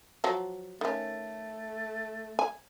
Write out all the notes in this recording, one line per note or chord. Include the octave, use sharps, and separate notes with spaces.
F3 F#3
D#3 A3 C#4
G#5